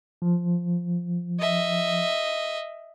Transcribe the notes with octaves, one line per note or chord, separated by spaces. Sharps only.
F3
D#5 E5